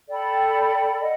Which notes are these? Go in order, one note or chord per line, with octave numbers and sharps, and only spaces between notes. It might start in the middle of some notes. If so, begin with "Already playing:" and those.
A4 D5 G5 B5
D#5 F#5